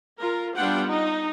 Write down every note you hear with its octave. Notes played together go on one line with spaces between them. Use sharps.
F4 A#4
G3 B3 D4 F4 F#5 G5
D#4